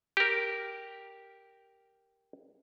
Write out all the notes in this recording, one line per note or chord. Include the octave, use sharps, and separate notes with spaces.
G4 A#4